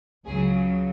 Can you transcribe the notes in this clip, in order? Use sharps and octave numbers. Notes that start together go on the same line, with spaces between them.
C#2 C#3 F#3 G#4